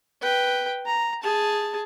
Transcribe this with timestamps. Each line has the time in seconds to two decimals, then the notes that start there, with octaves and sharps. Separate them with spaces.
0.22 B4 G5
0.86 A#5
1.23 G#4 A5